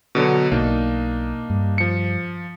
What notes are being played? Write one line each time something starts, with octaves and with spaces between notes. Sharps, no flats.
B2 D3 F#3
B1 A#3 D4 D#4
G2
F3 C#7